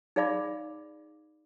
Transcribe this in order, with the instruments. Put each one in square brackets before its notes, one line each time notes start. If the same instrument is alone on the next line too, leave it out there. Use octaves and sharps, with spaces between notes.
[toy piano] D#4 G#4 D5 F5 B5 D6